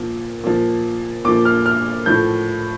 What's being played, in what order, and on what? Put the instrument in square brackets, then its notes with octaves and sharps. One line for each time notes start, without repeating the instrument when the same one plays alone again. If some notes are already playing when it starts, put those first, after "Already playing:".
Already playing: [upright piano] A#2 F3
A#2 F3
A#2 F3 D6
F6
F6
A2 F3 G6